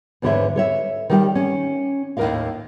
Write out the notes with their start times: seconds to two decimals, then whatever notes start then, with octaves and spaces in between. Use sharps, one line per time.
0.22 E2 G#2 D3 B4 C#5 E5
0.56 A4 C#5 E5
1.09 D#3 G3 G5
1.35 C#4
2.17 D#2 A2 G3 A#4 D#5 F5